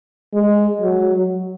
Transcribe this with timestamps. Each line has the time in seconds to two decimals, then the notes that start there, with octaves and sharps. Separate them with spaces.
0.33 G#3
0.81 F#3